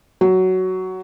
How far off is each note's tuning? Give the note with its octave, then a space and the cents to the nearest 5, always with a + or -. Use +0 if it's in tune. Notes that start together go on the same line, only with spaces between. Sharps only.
F#3 +10